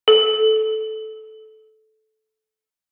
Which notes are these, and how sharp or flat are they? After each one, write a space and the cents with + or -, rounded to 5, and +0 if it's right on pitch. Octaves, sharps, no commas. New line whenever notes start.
A4 -15